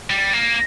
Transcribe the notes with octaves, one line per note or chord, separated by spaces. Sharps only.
G3
A#3